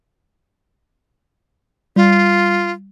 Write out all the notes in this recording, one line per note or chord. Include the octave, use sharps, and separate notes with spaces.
G3 F4